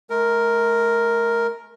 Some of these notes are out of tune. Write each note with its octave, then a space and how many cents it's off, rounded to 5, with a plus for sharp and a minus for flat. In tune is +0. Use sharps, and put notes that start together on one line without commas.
A3 -40 A#4 +0